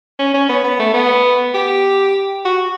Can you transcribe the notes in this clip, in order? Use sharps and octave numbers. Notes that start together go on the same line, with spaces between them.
C#4
C#4
B3
B3
A3
B3
G4
F#4